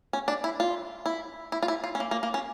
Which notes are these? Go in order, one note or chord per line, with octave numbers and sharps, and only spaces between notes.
C#4
D4
E4
F4
E4
E4
F4
E4
F4
C#4
A#3
A#3
A#3
C#4